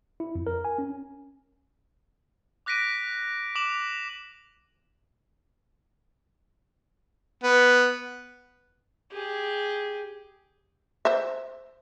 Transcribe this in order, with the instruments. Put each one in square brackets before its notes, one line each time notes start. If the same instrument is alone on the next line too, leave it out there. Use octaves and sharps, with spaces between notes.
[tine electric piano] E4
F2
A#4
G#5
C#4
[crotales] D6 F#6 A#6 B6 D7 D#7
D6 E7 F#7
[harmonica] B3
[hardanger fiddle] G4 G#4
[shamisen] C5 E5